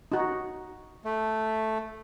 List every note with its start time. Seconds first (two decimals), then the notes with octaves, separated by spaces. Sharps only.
0.12 D#4 F#4
1.05 A3